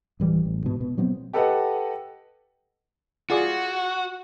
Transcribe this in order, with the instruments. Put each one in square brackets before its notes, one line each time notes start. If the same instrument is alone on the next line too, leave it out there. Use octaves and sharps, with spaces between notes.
[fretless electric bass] D1 E3 G3
A1
G#2 B2
B2
B2 F#3 B3 C4
[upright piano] G4 A4 B4 D#5 F#5
[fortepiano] F4 G#4 D5 [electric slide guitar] F#4